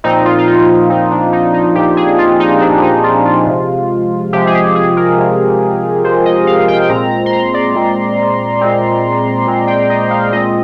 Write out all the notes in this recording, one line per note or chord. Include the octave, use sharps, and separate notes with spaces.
A#2 F3 C4 D#4
F4
F4
D#4
D#4
A#2 F3 C4 D#4
D4
D#4
D#4
A#2 F3 C4 G4
G#4
F4
D#4
A#2 F3 C4 D4
D#4
F4
F4
C3 F3 G#3
C3 F3 G#3 G4
G#4
G4
G#4
A#4
C3 F3 G#3
C3 F3 G#3 C5
D#5
F5
G5
A#2 G#3 C4 A#5
A#5
C6
A#5
D5
A#2 G#3 C4
A#2 G#3 C4
A#2 G#3 C4
G5
D#5
F5
A#2 G#3 C4 D#5